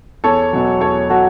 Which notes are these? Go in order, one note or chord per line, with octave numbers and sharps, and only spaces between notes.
E2 A4 C#5
B2 F#3
E2 A4 C#5
F#3 F#4 A4